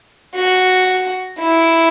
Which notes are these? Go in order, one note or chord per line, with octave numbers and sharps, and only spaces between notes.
F#4
E4